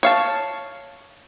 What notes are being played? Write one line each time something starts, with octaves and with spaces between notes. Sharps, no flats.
C#5 F5 A5